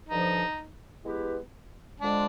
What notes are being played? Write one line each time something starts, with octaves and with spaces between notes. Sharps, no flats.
G2 D3 F3 D#4
G#3 B3 E4 G4 B4
D3 F3 G#3 D4